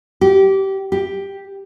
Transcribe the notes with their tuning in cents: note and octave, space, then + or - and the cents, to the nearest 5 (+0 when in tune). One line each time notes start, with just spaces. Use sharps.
G4 -20
G4 +5